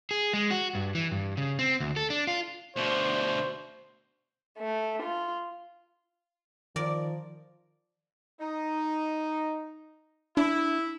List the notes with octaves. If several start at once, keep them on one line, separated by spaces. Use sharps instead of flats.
G#4
G#3
F#4
G2
E3
G2
C#3
C4
D2
A4
D4
F4
D2 B2 C5
A3
F4
D#3 F3 A#4 D5
D#4
D4 E4